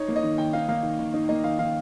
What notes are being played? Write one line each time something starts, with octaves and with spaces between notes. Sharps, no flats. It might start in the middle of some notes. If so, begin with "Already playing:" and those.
Already playing: D#4 C#5
A#3
D#5
D#3
D#3 G5
D#4 F5
A#3 F5
D#3
D#3
D#4
A#3 D#5
D#3 F5
D#3 F5